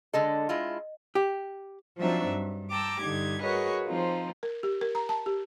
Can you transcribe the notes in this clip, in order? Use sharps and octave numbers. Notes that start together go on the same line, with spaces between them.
D3 G#3 A4 D#5
G#3 E4 F4
G4
F3 F#3 C4 D4 D#4 E5
G2
G5 A5 A#5 D6 E6
G2 D3 D#4 G4 G#6
F#4 G#4 A#4 B4 C#5 D#5
F3 C4 D#4 F4
A#4
G4
A#4
A#5
A5
G4